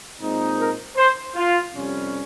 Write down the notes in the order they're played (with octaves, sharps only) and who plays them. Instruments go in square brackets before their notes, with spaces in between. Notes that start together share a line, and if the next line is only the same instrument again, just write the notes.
[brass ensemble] A#2 G#3 C4 D#4
A#4
C5
F4
F2 C3 G3 C#4